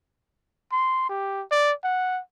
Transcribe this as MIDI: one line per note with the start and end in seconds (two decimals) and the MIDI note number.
0.72 1.08 84
1.09 1.42 67
1.51 1.72 74
1.84 2.20 78